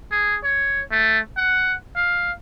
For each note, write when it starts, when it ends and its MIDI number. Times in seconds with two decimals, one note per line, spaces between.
0.12 0.37 68
0.44 0.81 73
0.91 1.19 57
1.37 1.74 78
1.96 2.32 77